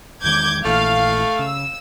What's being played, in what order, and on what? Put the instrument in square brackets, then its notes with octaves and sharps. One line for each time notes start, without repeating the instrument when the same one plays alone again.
[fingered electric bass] E2 D#3 G#3 [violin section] D6 G6 G#6
[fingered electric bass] A#1 A#2 E3 [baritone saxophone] A3 [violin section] F5
[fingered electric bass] C#3 [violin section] E6